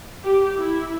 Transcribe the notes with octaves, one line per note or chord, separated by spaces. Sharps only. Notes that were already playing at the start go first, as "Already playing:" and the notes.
G4
E4